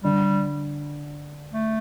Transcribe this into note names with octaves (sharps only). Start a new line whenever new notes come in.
D3 G3
A3